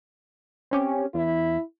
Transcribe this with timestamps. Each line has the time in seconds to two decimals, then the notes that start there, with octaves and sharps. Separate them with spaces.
0.71 C4 C#4 G4
1.14 E2 E4